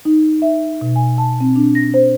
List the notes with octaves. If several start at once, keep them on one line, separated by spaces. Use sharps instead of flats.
D#4
E5
B2
G#5
A5
C4
D4
A#6
C5